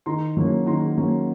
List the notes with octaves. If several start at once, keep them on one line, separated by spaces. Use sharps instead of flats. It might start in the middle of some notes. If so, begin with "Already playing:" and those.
D#3 A#5 C6
F#3 A#3 C#4
D#3 A#5 C6
F#3 A#3 C#4